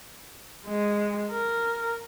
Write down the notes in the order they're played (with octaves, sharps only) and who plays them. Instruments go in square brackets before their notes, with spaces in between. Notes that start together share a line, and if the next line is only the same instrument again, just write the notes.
[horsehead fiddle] G#3
A#4